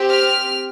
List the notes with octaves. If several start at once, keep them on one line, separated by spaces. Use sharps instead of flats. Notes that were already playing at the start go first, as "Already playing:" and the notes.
Already playing: C4 G4
F6